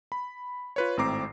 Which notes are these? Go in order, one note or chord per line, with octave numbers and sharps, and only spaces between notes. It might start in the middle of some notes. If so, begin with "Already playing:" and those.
B5
F4 B4 C#5
G#1 A2 C4 A#5 D6 C7